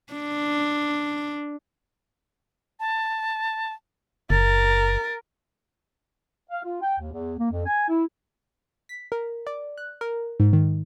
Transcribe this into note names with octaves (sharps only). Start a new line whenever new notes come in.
D4
A5
F#1 A#4 A6
F5
F4
G5
D#2
E2
A#3
F2
G#5
E4
B6
A#4
D5
F#6
A#4
G#2
D#3